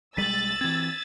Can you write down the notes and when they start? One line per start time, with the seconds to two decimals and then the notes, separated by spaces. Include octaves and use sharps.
0.17 B1 G3 G#3 E6 A6 B6 D#7 F#7
0.61 E3 C4 G#6